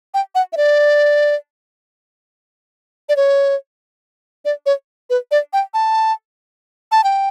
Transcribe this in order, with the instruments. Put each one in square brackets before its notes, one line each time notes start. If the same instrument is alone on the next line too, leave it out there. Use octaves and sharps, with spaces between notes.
[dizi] G5
F#5
E5
D5
D5
C#5
D5
C#5
B4
D5
G5
A5
A5
G5